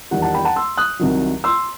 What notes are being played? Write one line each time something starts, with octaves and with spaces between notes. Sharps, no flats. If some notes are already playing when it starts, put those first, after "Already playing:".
E2 D#3 G3 F#5
F#5 A5
G5 B5
F#5 A5
C6 E6
D#6 F#6
C2 C3 D#3 F#3
C6 E6